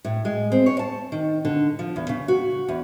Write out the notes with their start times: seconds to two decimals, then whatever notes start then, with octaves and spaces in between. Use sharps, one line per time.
0.05 A2
0.25 G#3
0.52 C4
0.66 C#5
0.79 A5
1.12 D#3
1.45 D3
1.79 F3
1.96 E2
2.09 C#3
2.28 F#4
2.69 E2